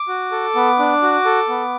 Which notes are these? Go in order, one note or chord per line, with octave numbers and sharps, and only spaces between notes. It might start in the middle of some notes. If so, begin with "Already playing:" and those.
Already playing: D6
F#4
A4
B3
D4
F#4
A4
B3